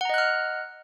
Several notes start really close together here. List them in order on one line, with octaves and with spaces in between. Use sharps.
F#5 A#5 D#5 F#6 F6